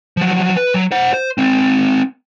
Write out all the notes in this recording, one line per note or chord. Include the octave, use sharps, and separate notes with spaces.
F3 F#3
B4
F#3
C5 F#5
C5
G#3 C4